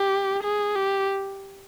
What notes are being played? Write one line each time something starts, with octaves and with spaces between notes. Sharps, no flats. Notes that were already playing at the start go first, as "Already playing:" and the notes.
Already playing: G4
G#4
G4